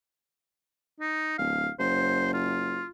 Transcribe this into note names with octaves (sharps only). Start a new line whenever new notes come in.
D#4
D1 F5
F#1 C5
F4